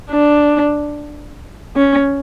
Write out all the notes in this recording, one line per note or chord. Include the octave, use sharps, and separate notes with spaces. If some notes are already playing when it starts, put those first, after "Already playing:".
D4
C#4